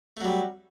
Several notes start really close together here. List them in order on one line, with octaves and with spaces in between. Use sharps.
A3 F#3 G3